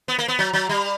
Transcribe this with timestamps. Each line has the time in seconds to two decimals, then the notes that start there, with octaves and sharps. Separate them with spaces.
0.08 B3
0.18 A#3
0.28 B3
0.39 F#3
0.53 F#3
0.69 G3